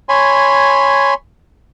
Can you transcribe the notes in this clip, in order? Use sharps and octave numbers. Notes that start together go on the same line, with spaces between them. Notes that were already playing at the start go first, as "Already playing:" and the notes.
C#5 G#5 B5 C6